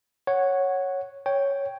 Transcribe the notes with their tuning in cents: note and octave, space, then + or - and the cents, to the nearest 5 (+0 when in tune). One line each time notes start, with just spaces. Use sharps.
C#5 -5 F#5 +0
C#5 +0 G5 +0